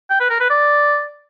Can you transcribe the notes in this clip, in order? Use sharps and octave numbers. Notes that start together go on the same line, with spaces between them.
G5
B4
A#4
B4
D5